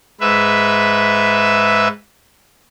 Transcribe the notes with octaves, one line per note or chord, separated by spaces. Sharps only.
G#2 B4 E5